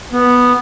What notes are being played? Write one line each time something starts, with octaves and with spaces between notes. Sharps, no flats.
B3